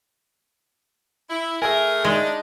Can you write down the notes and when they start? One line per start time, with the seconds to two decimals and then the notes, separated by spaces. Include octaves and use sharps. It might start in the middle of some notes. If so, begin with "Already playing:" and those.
1.29 E4
1.62 A3 G#4 A#4 E5 G#5
2.05 G#3 D4 D#4